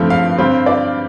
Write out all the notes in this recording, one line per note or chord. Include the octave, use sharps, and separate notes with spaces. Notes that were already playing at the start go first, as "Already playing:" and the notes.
Already playing: G2 F3 A3 C4
F5
G2 G3 C4
D5